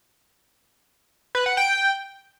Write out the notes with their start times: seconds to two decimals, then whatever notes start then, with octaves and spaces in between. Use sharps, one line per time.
1.35 B4
1.46 F#5
1.57 G5